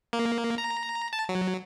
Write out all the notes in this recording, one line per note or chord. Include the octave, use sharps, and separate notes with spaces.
A#3
A#5
A5
F#3